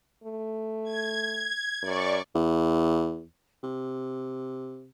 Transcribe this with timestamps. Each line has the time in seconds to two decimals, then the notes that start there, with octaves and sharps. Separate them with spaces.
0.24 A3
0.84 G#6
1.83 F#2 D5 C#6
2.35 E2
3.63 C3